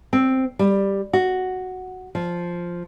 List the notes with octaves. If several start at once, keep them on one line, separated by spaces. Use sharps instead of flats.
C4
G3
F#4
F3